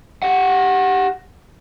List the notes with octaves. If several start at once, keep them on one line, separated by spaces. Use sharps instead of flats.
G4 F#5